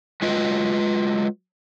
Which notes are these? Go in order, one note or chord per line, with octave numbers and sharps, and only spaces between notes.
F#3 G#3 F4 B4 D#5